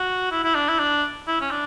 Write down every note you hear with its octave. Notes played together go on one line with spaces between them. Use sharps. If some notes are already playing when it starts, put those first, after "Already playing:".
Already playing: F#4
E4
E4
D4
E4
D4
E4
C#4
D4